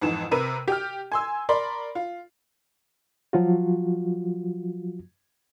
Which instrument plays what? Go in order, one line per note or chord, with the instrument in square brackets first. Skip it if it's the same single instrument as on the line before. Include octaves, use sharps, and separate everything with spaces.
[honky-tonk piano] F2 G#2 E3 E7
C3 A#4 B4 D#7
G4 G5 F6
G#5 C6 E6
A#4 D5 B5 C6
F4
[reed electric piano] F3 F#3 F4 F#4